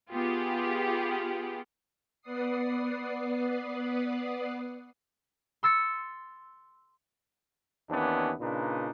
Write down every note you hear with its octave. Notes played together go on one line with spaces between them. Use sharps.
B3 F4 G4 G#4
B3 B4 D5 F#5 D#6 C7
C6 E6 A6 C#7
D#2 E3 B3 C#4 D4
A#2 C#3 D4 D#4 B4